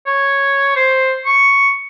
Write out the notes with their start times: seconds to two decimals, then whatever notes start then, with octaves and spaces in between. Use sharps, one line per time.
0.07 C#5
0.76 C5
1.25 C#6